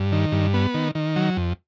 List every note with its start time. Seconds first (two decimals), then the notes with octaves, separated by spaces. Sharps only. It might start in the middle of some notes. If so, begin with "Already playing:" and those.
Already playing: G2
0.12 D#3
0.32 G2
0.54 B3
0.74 D#3
0.95 D#3
1.16 F#3
1.37 F2